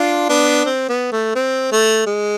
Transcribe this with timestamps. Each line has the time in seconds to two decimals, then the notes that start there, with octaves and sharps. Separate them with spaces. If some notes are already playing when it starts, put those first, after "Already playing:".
Already playing: D4 F4
0.29 B3 D4
0.66 C4
0.89 B3
1.12 A3
1.35 C4
1.72 A3
2.06 G#3